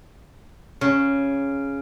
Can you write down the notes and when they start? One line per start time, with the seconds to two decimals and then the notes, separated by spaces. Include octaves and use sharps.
0.81 C#3